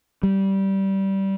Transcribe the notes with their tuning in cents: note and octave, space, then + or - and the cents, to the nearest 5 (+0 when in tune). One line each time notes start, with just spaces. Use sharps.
G3 -15